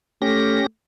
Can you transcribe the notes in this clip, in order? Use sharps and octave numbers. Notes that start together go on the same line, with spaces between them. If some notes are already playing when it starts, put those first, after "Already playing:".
A3 C#4 G4 A#6